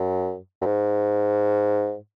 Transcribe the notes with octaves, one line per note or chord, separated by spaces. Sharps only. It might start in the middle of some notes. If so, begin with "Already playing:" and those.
Already playing: F#2
F#2
G#2